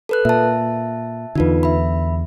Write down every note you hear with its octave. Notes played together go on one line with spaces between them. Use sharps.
A4 B4 F#6
A#2 E5 A5
E2 D3 D#4 F4 B4
E5 B5